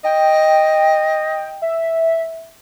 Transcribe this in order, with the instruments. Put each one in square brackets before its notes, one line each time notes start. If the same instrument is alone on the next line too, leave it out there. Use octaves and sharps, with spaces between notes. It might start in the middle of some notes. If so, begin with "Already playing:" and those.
[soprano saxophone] D#5 [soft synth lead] G5
[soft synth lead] E5